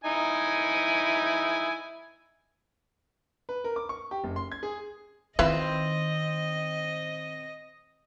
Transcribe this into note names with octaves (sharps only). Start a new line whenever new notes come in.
D#4 E4 G#5
B4
A#4
D6
C#6
G4
F#1
C6
G#6
G#4
D#3 C4 E4 F4 B4 D#5